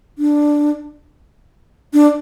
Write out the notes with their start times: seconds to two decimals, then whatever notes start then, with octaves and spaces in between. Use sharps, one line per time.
0.18 D4
1.93 D4